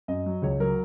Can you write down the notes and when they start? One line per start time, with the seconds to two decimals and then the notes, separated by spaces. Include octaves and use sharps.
0.08 F#2 D#5
0.26 F#3
0.42 C#2 C#5
0.60 F#3 A#4